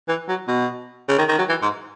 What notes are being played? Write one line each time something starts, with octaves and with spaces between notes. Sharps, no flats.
E3
F#3
B2
C#3
D#3
D#3
F#3
E3
G#2